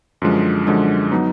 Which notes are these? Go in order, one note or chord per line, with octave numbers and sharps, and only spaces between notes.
F#2 D3 F3 G#3
F#2 D3 F3 G#3
F#3 B3 D#4